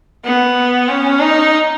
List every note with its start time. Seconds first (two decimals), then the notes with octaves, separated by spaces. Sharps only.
0.25 B3
0.88 C#4
1.20 D#4